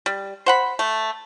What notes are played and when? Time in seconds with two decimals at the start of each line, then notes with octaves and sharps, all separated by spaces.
0.06 G3
0.46 C5 F#5 B5
0.79 A3